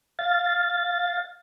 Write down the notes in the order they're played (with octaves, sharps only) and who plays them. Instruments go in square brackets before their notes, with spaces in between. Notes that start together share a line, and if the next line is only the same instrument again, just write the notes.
[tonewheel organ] F5 A6